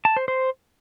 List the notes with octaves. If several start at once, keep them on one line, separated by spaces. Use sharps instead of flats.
A5
C5
C5